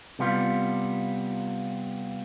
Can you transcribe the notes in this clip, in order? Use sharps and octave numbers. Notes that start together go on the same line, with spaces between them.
C3 G3 B3 F4